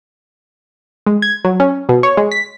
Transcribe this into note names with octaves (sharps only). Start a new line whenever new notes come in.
G#3
G#6
F#3
C#4
B2
C#5
G#3
B6